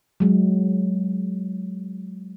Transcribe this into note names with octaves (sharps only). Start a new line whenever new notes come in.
F#3 G#3